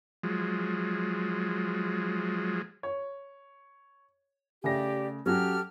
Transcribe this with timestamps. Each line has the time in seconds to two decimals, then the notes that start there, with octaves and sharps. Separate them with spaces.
0.23 F3 F#3 G#3
2.83 C#5
4.64 C#3 A3 G4 D5 A#6
5.26 F#3 C#4 F#4 G4 A4 F6